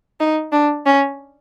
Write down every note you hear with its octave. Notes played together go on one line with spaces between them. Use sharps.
D#4
D4
C#4